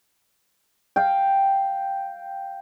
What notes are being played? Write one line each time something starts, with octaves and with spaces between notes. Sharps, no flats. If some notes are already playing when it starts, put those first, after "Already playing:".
F5 G5